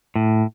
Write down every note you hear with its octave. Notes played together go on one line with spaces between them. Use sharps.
A2